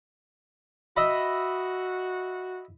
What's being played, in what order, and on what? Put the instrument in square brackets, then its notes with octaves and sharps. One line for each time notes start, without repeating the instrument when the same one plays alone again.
[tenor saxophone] F#4 [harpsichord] D#5 E5 B5